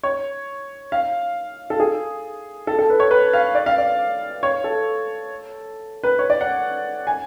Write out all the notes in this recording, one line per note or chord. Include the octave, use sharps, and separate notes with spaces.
C#5
F5
A4
G#4
A4
A4
B4
C#5
B4
F5
D5
F5
D5
C#5
A4
B4
C#5
D5
F#5
G#5